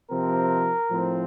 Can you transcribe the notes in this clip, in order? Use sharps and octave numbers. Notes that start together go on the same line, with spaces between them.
C3 F3 C4 A#4
A2 F3 C4